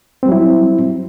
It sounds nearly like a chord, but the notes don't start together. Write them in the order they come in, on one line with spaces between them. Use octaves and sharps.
C4 G3 F#3 E4